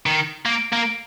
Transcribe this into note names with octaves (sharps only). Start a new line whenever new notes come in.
D#3
A#3
A#3